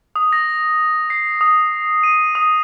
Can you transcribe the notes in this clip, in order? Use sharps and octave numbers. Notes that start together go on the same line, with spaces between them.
D#6
A#6
C7
D#6
D#7
D#6